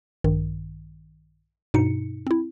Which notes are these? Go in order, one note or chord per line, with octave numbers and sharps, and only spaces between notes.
A#1 G2 D#3
G2 B2 D#4 C#7
C4 E4